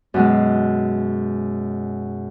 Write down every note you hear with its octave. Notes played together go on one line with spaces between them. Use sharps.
F#2 B2 G#3